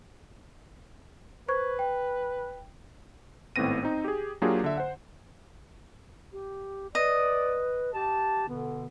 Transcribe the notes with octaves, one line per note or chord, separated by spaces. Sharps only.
B4 C5 C#6 G#6
G5
G#1 A2 B3 C4 A#6 D#7
C4 D#4
G4 G#4
F#3 A#3 D4 F4 G4 G#4
D3 E5
C5 F#5
G4
B4 D5 D#5
G4 A5
B2 D3 B3